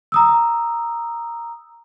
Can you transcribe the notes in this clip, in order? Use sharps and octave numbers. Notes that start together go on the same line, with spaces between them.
A#5 D#6 E6